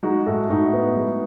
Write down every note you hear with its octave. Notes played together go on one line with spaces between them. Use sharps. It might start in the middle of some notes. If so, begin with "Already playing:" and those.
G#3 D#4 F#4
A2 F#4 A4
A2 D#4 F#4
B3
G#3